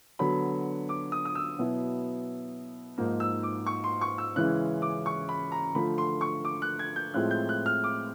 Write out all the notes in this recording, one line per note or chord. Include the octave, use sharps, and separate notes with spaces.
D3 F#3 B3 B5
D6
D#6
D#6
E6
B2 F#3 B3 E4
G#2 F3 A#3 D#4
E6
D6
C#6
C6
C#6
E6
C#3 E3 G#3 C#4 E4 F#6
D6
C#6
B5
A#5
D3 F3 A3 B5
C6
C#6
D6
F#6
G#6
G6
A2 F3 G#3 C4 E4 F#6
G6
F#6
F6
D6